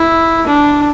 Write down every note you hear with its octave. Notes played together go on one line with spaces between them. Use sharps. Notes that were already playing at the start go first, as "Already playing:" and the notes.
Already playing: E4
D4